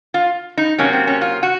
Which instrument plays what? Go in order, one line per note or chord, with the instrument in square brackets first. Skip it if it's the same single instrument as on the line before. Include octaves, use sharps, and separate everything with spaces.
[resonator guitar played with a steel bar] F4
D#4
C3 F#3 A#3 C#4
C4
C#4
F4
F#4